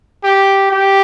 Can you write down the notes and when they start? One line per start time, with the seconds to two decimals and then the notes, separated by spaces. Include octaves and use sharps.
0.24 G4
0.71 G4